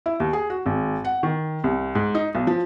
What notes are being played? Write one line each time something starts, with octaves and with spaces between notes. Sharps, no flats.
E4
D#2
G#4
F#4
G#1
F#5
D#3
C2
G#2
D#4
B1
F3